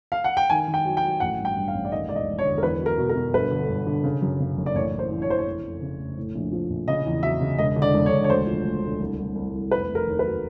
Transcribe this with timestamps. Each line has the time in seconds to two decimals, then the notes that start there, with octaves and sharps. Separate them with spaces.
0.12 F5
0.24 F#5
0.37 G5
0.50 D#3 G#5
0.68 D#3
0.74 G5
0.85 F#3
0.97 G5
1.03 F#3
1.20 A1 F#5
1.39 G2
1.45 G5
1.56 G2
1.68 F5
1.74 A1
1.85 D5
1.92 D#2 D#5
2.09 E1 D5
2.16 D#5
2.27 E1
2.39 C#5
2.45 D3
2.58 A#4
2.62 E2 B4
2.80 F#3
2.86 A#4
2.98 B2
3.09 A#4
3.15 B2
3.33 G1 B4
3.51 D3
3.69 G1
3.87 D3
4.04 C#3
4.22 F#2
4.40 C#3
4.57 F#1
4.66 D5
4.75 A1 C#5
4.93 E3
4.99 C5
5.11 E3
5.22 C#5
5.28 E3 C5
5.38 C#5
5.46 F1
5.64 F1
5.82 C#3
5.99 F1
6.17 A2
6.35 A#1
6.52 F3
6.70 A#1
6.88 C#3 D#5
7.06 E2
7.23 F#3 E5
7.41 C#3
7.58 E1 D#5
7.76 D3
7.82 D5
7.94 E1
8.06 C#5
8.11 E1
8.24 C#5
8.29 D2 C5
8.47 F3
8.65 D2
8.83 D2
9.00 C2
9.18 C2
9.35 C2
9.54 C2
9.71 F1 B4
9.88 F1
9.95 A#4
10.07 D#2
10.19 B4
10.24 F#3